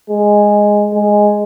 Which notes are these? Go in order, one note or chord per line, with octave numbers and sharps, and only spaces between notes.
G#3
G#3